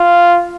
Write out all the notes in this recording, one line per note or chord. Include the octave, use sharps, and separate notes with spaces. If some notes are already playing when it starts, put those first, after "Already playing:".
Already playing: F4